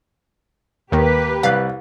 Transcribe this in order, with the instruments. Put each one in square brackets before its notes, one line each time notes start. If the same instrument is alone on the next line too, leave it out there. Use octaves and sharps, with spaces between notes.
[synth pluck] D#2 D#3 [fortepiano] A#3 [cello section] G4 B4
[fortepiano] C2 F#6 [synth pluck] F5